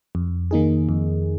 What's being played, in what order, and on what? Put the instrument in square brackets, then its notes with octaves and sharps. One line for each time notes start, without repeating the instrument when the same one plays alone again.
[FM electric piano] F2
D#3 A#3 D#4 G#4
F2